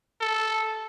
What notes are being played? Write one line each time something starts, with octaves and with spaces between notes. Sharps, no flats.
A4